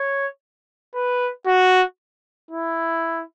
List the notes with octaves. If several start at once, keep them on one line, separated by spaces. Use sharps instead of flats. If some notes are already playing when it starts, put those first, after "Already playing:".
Already playing: C#5
B4
F#4
E4